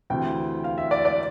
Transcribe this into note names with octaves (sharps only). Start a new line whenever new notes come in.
D2 C3 E3 G5
F5
E5
D5
D5